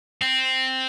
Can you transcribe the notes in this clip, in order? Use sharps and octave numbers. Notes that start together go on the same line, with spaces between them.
C4